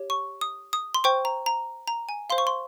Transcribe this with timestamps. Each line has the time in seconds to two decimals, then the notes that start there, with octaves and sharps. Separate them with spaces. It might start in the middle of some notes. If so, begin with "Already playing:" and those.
Already playing: G4 C#5
0.10 C#6
0.41 D#6
0.73 D#6
0.94 C6
1.04 C5 G5 C#6
1.25 A#5
1.46 A#5
1.88 A#5
2.09 G#5
2.30 C5 F5 C6
2.38 C#6
2.47 C6